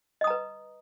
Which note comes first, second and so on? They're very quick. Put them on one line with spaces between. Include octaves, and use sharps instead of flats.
D#5 D#6 A#5 B4